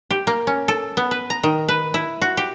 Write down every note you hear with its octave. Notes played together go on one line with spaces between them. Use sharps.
G4
A#3
C#4
A4
B3
B4
A#5
D#3
B4
E4
F#4
G4